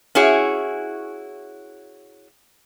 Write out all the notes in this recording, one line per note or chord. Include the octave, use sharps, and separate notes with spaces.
C#4 E4 F#4 G#4 C#5